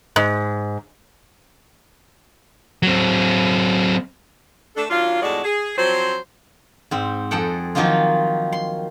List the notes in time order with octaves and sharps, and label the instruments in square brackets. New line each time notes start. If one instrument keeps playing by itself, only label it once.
[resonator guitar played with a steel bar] G#2
[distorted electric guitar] F#3 C4
[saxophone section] A3 D4 A4
D#3 F#3 D4 F4
F2 A2 G#3 F#4 A4 D5
G#4
F3 F#3 C4 C5
[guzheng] G#2 C4
F2 G#4 A4 F#5 G5
D#3 F3 F#3 A#3 D#4 F4
C6